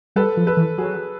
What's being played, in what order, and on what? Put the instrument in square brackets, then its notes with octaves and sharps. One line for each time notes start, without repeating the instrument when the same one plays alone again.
[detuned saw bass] G3 [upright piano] A4 B4
[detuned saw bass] F3
[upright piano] A4 B4
[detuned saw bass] E3
[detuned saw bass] F#3 [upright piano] G#4